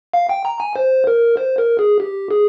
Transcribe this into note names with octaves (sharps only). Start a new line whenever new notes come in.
F5
G5
A#5
G#5
C5
A#4
C5
A#4
G#4
G4
G#4